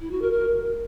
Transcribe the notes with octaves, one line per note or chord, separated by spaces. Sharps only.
E4
F#4
A#4
A#4